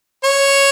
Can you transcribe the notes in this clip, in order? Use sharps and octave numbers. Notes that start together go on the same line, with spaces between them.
C#5